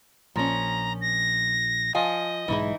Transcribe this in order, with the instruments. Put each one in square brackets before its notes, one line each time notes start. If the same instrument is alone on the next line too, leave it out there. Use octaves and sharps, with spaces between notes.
[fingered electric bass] A#1 A#2 [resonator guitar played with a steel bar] F3 C#4 [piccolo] A#5
[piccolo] A#6
[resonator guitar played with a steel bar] F3 F5 G#5 [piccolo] D#5
[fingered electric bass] B1 G#2 G#3 [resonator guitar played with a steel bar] E3 D#4 E4